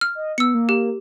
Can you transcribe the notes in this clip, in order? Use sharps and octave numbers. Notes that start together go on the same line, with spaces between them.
F6
D#5
B3 E6 C#7
A#3
G4